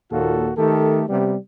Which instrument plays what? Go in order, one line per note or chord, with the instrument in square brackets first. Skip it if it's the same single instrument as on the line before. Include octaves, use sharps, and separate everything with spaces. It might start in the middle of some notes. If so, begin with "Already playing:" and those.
[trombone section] D#2 A#2 F4 F#4 A4
D#3 A3 G4 A4
C3 G3 B3